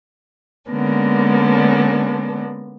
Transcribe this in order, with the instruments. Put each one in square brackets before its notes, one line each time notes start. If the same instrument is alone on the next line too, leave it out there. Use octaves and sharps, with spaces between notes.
[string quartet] D3 G#3 A#3 B3 C#4 D4